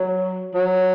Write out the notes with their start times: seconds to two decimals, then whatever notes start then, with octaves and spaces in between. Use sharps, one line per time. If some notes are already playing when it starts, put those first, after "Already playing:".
Already playing: F#3
0.54 F#3